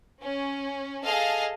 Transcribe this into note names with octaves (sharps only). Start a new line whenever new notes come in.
C#4
G#4 A4 D#5 F5 A5